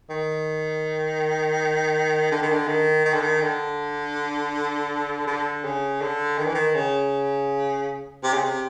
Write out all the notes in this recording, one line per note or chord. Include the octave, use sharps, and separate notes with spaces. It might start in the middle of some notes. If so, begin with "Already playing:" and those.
D#3
D3
D#3
D3
D#3
D#3
D3
D#3
D3
D3
C#3
D3
D#3
E3
D#3
C#3
C3
C#3
C3